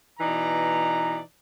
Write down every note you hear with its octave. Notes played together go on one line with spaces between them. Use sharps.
B2 E3 D#4 D5 A#5